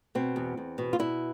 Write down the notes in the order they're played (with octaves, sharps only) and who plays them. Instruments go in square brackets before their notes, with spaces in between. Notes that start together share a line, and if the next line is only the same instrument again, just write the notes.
[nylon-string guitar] B2 C4
E2
E2
B2
F4
B2 E4